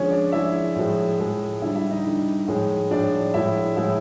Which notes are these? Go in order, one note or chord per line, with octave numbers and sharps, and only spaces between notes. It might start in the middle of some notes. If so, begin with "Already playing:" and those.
Already playing: D3 F3 G#3 C#4 C#5
D4 D5
D3 F3 G#3 E4 E5
A2 F3 G#3
A2 F3 G#3
D3 G3 E4 E5
E4 E5
D#4 D#5
D3 G3
A2 F3 G#3
A2 F3 G#3 D4 D5
A2 F3 G#3 E4 E5
A2 F3 G#3 E4 E5